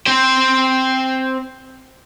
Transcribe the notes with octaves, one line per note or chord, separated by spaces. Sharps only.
C4 C5